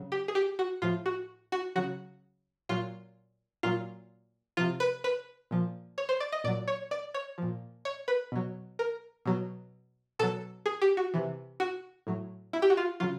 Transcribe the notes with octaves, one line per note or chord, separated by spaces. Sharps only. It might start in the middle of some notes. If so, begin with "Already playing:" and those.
Already playing: C#3 F#3
G4
G#4
G4
F#4
A2 F3 F4
F#4
F#4
C#3 F#3 F#4
A#2 F#3 F4
A#2 F#3 F4
C3 F3 F4
B4
B4
A#2 F3
C#5
C5
D5
D#5
A#2 F#3 D5
C#5
D5
C#5
A#2 F3
C#5
B4
B2 F#3
A#4
B2 F#3
B2 F#3 A4
G#4
G4
F#4
C3 E3
F#4
A2 F#3
E4
G4
F#4
F4
C#3 F#3 F4